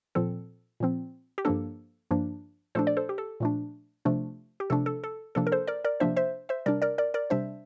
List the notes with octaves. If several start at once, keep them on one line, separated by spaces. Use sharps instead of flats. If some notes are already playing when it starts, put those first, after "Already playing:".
A#2 F3 C4 A4
A#2 F3 C4
G4
G2 F3 A#3 D4 A4
G2 F3 A#3 D4
A#2 F3 A3 D4 A4 C5
D5
A4 C5
G4
A4
A#2 F3 A3 D4
C3 F3 A3 D4
G4
C3 F3 A3 D4 A4
A4
A4
C3 F3 A#3 D4 A4
A#4
A4 C5
A#4 D5
A#4 D5
C3 F3 A#3 D4 C5 E5
C5 E5
C5 E5
C3 G3 D4 A#4 D5
A#4 D5
A#4 D5
A#4 D5
C3 G3 D4 C5 E5